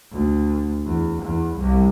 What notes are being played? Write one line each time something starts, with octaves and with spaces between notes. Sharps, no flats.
D2
E2
E2
C2